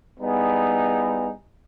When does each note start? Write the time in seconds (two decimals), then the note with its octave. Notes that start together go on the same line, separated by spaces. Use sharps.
0.20 G3 B3 D#4 E4 G#4